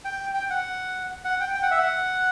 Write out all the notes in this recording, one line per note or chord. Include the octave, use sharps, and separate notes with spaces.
G5
G5
F#5
F#5
G5
G5
F#5
E5
F#5